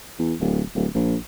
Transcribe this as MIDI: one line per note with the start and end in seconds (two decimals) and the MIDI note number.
0.19 0.34 40
0.40 0.62 26
0.75 0.87 26
0.95 1.15 34